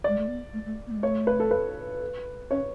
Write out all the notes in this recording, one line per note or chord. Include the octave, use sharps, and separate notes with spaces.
G#3 D5
A3
B3
A3
A3
B3
A3
G#3
A3 C#5
B4
A4
B4
C#4 C#5